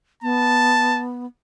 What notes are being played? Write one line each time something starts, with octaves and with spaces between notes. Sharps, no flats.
B3 A5